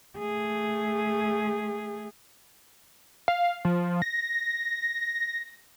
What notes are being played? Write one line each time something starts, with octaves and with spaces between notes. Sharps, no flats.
A3 G#4
F5
F3
A#6